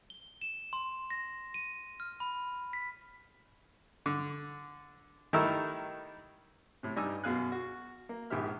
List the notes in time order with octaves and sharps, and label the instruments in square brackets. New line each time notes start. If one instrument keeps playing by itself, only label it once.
[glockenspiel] G7
E7
C6
A#6
D#7
F6
B5
B6
[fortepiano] D3
D#3 G3 A3 E4 A#4 E6
A2 C3
G2 G3 D#4 G#5 D6 E6
F#2 B2 G#4 F5 G#5 F#6
F#4
A#3
A#1 G#2 D#3 G4 E5 F6